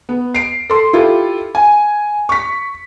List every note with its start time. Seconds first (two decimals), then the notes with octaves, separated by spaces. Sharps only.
0.09 B3
0.35 C7 D7
0.70 A4 C6
0.93 E4 F4 G4 A4
1.55 G#5
2.29 C#6 B6